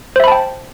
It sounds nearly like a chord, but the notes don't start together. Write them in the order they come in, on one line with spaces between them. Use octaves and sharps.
C5 E5 B5 A5 G5